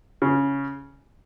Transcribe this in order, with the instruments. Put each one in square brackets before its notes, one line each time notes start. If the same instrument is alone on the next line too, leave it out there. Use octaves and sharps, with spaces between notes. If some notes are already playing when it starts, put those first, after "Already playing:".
[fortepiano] C#3